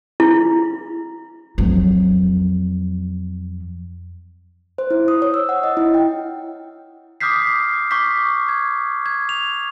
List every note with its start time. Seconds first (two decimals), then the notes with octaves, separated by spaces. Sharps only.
0.20 E4
1.58 F2 F#3
4.78 C5
4.91 E4
5.08 D#6
5.22 C#5
5.34 E6
5.49 F#5
5.64 D#5
5.77 E4
5.94 G5
7.21 D6 D#6 F6 G6 B6 C7
7.91 C#6 D6 G6 B6
8.49 G#6
9.06 G#6
9.29 F7